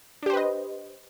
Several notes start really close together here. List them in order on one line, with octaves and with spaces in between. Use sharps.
D4 G4 C5 B4 D#5